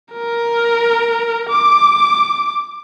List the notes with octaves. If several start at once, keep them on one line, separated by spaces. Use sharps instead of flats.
A#4
D6